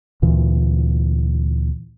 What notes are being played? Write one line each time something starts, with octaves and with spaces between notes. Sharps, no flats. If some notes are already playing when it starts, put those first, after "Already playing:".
D2 A#2 E3